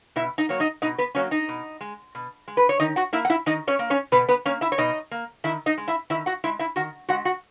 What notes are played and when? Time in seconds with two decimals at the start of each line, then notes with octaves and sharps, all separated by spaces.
0.16 B2 E4 E5
0.38 D#4 D#5
0.49 F#3 A#3 C#5
0.60 D#4 D#5
0.82 B2 D#4 D#5
0.98 B3 B4
1.15 F#3 A#3 C#4 C#5
1.31 D#4 D#5
1.48 B2
1.81 G#3
2.15 B2
2.48 G#3
2.57 B4
2.69 C#5
2.80 D#3 D#4 D#5
2.96 F#4 F#5
3.13 A#3 E4 E5
3.25 F#5
3.30 E4 E5
3.46 D#3 D#4 D#5
3.67 C#4 C#5
3.79 A#3
3.90 C#4 C#5
4.12 B2 B3 B4
4.28 B3 B4
4.45 A#3 C#4 C#5
4.61 E4 E5
4.72 C#5
4.78 B2 D#4 D#5
5.11 A#3
5.44 D#3 E4 E5
5.66 D#4 D#5
5.78 G#3
5.88 E4 E5
6.10 D#3 E4 E5
6.26 F#4 F#5
6.44 G#3 E4 E5
6.59 E4 E5
6.76 D#3 F#4 F#5
7.09 G#3 F#4 F#5
7.25 F#4 F#5